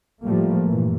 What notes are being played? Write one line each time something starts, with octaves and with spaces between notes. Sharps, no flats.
A2 F3 G3 A3 A#3
G2 A#2 E3